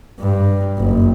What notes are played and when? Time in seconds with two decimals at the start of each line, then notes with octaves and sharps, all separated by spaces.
0.20 G2
0.78 F#1